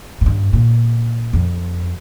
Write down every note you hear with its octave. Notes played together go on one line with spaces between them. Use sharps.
A#2
G2
A#2
F2